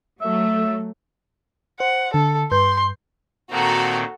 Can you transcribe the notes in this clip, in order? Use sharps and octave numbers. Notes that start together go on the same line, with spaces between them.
F#3 A3 E5
C5 F#5
D3 A4
G2 B4 C6 G6
A#2 D#3 C4 F#4 A4 A#5